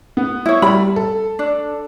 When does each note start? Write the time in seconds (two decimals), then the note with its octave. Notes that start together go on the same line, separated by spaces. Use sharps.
0.17 B3
0.46 E4 C#5
0.62 G3 B5
0.96 A4
1.39 D4